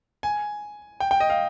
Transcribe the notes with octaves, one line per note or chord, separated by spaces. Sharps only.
G#5
G5
G5
D#5
F5